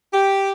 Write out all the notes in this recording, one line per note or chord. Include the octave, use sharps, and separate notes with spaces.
G4